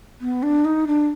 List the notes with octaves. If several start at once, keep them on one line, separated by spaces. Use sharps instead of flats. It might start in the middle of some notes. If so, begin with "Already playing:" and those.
B3
D4
D#4
D4